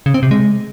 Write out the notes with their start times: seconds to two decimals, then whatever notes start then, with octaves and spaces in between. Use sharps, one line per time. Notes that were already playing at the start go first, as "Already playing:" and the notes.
0.06 C#3
0.14 C4
0.23 C3
0.31 G#3